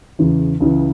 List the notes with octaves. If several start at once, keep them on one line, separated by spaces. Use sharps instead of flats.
E2 C#3 E3
C#2 C#3 E3